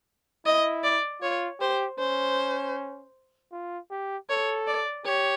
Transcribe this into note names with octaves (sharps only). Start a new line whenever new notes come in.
E4 D#5
D5
F4 C#5
G4 C5
C#4 C5
F4
G4
A4 C#5
D5
G4 C#5